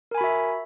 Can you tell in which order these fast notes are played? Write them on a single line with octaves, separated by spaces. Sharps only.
A#4 G#5 B5 F#4 E5